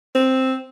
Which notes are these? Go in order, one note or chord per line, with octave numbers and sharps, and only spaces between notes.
C4